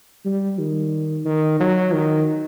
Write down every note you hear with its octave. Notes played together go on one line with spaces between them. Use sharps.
G3
D#3
D#3
F#3
D#3